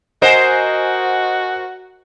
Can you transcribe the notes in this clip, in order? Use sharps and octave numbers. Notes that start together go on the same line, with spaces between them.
F#4 A#4 C5 D#5 F#5 G#5